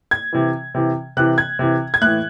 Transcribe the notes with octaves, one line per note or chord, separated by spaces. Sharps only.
G#6
C3 E3
C3 E3
C3 E3 F#6
G#6
C3 E3
G#6
A2 E3 F#6